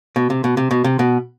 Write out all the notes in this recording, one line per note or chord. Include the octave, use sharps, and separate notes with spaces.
B2
C3
B2
C3
B2
C3
B2